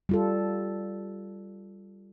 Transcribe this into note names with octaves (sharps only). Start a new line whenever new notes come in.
G3 F4 A4